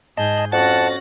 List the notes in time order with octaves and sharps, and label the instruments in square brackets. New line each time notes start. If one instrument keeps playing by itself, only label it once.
[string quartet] G#2 G#4 G6 [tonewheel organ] D#5 A5
[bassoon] F2 [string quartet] C#4 F#4 A#6 [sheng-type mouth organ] F#5 A5 [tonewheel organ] A6